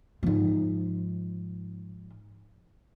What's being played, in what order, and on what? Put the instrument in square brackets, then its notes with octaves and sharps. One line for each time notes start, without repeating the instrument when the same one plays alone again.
[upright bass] G#2 F3